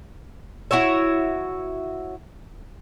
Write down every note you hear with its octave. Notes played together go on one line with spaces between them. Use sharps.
E4 F#4 C#5 E5